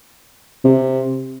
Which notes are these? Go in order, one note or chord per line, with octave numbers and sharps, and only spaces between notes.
C3